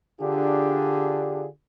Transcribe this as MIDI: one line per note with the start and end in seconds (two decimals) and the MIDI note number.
0.21 1.47 50
0.21 1.47 62
0.21 1.47 65
0.21 1.47 67
0.21 1.47 68